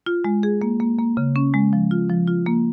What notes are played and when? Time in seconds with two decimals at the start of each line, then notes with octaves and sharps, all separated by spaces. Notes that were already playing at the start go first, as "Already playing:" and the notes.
0.06 F4
0.25 G#3
0.43 G#4
0.62 A#3
0.80 A#3
0.99 A#3
1.17 C#3
1.36 C#4
1.54 G#3
1.73 F3
1.91 F4
2.09 F3
2.28 F4
2.46 A#3